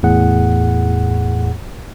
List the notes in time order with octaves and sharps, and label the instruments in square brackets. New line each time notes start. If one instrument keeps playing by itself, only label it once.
[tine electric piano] E2 A2 G#4 F#5